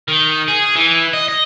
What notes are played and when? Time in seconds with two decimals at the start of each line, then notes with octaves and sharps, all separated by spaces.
0.08 D#3
0.48 G#4
0.75 E3
1.13 D#5
1.28 D#5